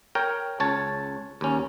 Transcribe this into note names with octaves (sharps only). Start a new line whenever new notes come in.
A#4 C#5 G5
C#2 C#5 A5
D#2 C#4